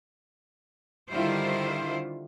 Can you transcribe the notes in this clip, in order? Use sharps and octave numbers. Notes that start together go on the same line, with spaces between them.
D3 D#3 G3 E4 F4 C5